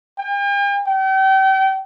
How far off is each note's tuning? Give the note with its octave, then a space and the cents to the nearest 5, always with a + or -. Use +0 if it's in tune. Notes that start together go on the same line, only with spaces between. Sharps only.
G5 +45
G5 -35